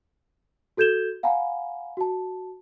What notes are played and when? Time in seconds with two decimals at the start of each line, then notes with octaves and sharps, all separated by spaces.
0.77 F#4 A4 G6 G#6 E7 G7
1.23 F5 F#5 G#5 A#5 B5
1.97 F#4 A5